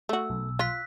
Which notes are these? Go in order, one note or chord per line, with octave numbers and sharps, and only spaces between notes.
A3 F#4 E6
B1
F4 F#6 B6